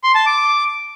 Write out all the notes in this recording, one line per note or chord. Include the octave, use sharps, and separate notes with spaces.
C6
A5
D6